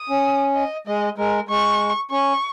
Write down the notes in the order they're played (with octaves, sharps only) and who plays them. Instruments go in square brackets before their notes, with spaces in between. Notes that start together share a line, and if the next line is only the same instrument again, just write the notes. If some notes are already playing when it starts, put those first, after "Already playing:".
Already playing: [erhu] D#6
[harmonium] C#4
[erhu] D#5
[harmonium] G#3 [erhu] D#5
[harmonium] G#3 [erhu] A#4
[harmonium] G#3 [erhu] C#6
[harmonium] C#4 [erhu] C#6